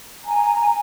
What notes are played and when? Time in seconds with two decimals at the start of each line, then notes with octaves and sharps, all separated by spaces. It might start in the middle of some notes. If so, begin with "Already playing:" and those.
0.24 G#5 A#5